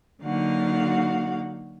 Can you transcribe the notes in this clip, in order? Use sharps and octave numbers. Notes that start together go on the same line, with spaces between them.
D3 F#3 A#3 D#4 F#4 F5